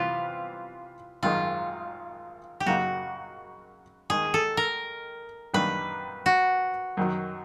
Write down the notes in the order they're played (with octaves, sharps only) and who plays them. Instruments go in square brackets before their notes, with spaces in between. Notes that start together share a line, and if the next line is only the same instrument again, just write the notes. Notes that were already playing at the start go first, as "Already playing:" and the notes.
Already playing: [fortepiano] C3 E3 G3 B3 [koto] F4
[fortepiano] G#1 F#2 D#3 G#3 [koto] F4
[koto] G4
[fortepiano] F#2 C#3 F#3 A#3 D#4 [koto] F#4
[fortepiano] D#2 D#3 G#3 [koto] G#4
[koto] A4
A#4
[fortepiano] F#2 D#3 G3 A#3 D4 [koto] B4
[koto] F#4
[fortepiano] F#2 D#3 F#3